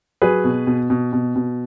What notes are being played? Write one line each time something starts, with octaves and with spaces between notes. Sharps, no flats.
F#3 G#4 B4
B2
B2
B2
B2
B2